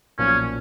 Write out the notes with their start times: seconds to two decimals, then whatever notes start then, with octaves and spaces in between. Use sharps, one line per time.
0.19 B1 A#2 F3 C#4